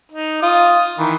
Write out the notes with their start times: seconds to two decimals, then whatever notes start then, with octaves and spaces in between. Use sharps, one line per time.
0.12 D#4
0.42 F4 D#6
0.98 D#3 E3